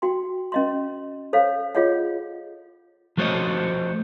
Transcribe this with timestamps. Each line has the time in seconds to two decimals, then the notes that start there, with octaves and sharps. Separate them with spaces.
0.02 F#4 G5 C6
0.52 C#4 D#5 C6
1.33 A4 C5 C#5 F5
1.75 F4 G#4 C#5 D#5 F#5
3.17 F3 A3 F#4 C5 C#5 D#5